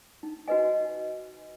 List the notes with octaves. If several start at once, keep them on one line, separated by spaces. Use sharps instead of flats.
D#4
F#4 B4 D#5 G#5